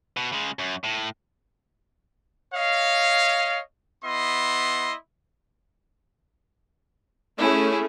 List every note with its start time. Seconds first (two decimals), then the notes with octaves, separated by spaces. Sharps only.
0.17 B2
0.32 C#3 G#3
0.59 F#2
0.84 A2
2.54 C#5 D#5 F5
4.04 B3 E4 D#5 C6
7.38 A3 C#4 E4 G#4